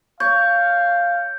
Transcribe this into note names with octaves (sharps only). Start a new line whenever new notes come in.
C#5 F5 G6